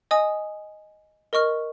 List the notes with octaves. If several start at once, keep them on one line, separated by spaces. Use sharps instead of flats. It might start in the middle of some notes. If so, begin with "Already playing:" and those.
D#5 G#5 D#6
A#4 D#5 C#6 F6